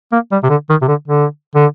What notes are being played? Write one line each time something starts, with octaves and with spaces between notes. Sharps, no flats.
A#3
G3
C3
D3
D#3
C3
D3
D3
D3